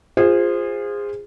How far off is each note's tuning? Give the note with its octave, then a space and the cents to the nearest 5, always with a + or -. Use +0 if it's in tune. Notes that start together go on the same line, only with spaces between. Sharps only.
F4 +0 G#4 -25 C5 +0